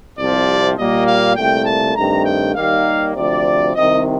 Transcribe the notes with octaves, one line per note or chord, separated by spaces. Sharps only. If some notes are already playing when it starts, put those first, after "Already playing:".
C2 C3 F3 D5
A#2 G3 A#3 D#5
F5
C2 A#2 A3 G5
A5
G2 D#3 A3 C4 A#5
G5
D#2 D#3 G3 A#3 F5
D2 C3 F3 D5
C2 C3 D#3 D#5